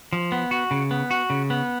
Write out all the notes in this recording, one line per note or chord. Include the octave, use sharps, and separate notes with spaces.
F3
B3
F#4
C#3
B3
F#4
C#3
B3